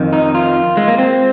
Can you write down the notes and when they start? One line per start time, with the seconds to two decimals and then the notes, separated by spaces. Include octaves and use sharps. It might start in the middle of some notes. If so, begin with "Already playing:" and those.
Already playing: F2 D#3
0.13 D#4
0.35 F4
0.77 G#3
0.88 A#3
0.98 C4